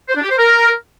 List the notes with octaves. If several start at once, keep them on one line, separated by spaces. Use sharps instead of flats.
C5
D4
G4
C5
A#4